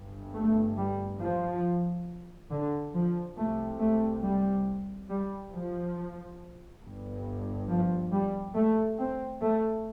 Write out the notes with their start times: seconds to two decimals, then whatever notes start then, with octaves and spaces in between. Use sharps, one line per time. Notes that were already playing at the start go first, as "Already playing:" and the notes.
Already playing: G1 G2
0.34 A3
0.78 G3
1.21 F3
2.51 D3
2.94 F3
3.37 C2 C3 A3
3.80 A3
4.23 G3
5.10 G3
5.53 F3
6.83 G1 G2
7.69 F3
8.12 G3
8.56 A3
8.99 C4
9.42 A3